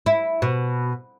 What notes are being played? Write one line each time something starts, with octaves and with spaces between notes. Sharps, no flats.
E4
B2